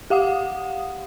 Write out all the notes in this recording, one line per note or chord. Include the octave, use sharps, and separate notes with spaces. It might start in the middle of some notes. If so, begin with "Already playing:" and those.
G4 F5 F#5 D#6